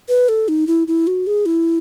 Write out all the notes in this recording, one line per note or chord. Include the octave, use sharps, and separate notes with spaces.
B4
A4
D#4
E4
E4
F#4
G#4
E4